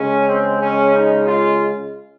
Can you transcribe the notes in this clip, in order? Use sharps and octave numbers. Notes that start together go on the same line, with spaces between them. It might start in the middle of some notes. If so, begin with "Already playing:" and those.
Already playing: C#3 G#3 C#4
C4
C#4
D#4
F4